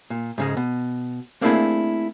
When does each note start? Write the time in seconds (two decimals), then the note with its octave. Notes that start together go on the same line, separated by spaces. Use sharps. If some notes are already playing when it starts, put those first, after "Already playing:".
0.10 A#2
0.38 G#2 C#3 G#3
0.57 B2
1.41 A3 A#3 C4 D4 E4 G#4